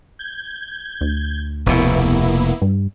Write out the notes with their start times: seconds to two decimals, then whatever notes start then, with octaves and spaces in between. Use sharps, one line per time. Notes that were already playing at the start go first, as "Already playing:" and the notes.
0.19 G6 G#6
1.01 D2
1.66 F1 B2 A#3 B3 E4
2.62 G2